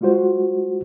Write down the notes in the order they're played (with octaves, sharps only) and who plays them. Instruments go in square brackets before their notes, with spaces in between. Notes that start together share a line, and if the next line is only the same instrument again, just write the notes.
[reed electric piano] G3 G#3 F4 F#4 C5